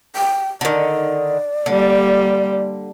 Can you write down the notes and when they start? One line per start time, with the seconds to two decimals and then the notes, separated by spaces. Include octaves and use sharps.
0.16 G5
0.61 D3 D#3 D5
1.66 D3 G3 A#3